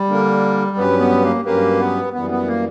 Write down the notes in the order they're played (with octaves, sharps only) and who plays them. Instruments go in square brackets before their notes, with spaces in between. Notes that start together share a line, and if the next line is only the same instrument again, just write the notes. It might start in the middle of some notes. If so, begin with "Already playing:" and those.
Already playing: [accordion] G3
[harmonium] D3 A#3 D4 A#4
[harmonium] G2 F#3 C#4 G4 B4 [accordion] B3
[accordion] B3
A#3
[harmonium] G2 F#3 C#4 G4 B4 [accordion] A#3
[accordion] B3
[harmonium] F#2 E3 G3 [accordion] B3
[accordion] B3
A#3